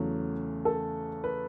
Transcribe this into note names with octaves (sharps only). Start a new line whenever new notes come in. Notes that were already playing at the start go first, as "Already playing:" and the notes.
Already playing: E2 C#3 F#3 A3
A4
B4